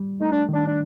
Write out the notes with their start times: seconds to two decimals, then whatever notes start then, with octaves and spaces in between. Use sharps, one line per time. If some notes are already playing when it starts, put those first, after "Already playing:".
Already playing: G3
0.21 A3 D#4
0.32 D4
0.49 D#3
0.54 D4
0.67 D4